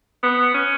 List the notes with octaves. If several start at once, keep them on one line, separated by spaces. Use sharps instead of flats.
B3
C#4